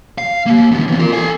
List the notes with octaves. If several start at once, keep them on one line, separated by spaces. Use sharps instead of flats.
F5
A#3 G4
D#2 B3
E3 C4
F4 A#4
A4 G#5